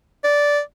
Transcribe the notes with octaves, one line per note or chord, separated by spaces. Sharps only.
D5